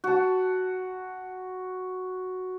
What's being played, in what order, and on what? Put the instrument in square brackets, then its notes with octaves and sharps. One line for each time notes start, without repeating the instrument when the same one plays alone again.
[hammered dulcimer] F#4 A5